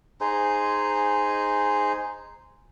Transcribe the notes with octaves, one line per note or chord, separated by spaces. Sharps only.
D#4 G#4 C5